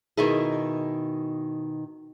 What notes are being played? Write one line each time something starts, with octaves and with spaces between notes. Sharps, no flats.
B2 D#3 D#4 E4 G#4